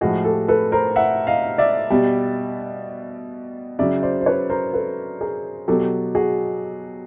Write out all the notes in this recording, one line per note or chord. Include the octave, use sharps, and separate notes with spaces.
A2 F3 G#3 F#4 G#4
G4 A4
A4 B4
A#4 C5
E5 F#5
D#5 F5
D5 E5
B2 G3
C#3 F#3 D5 E5
C5 D5
C5
B4 C#5
A#4 C5
A4 B4
G#4 A#4
B2 F#3 G4 A4
F#4 G#4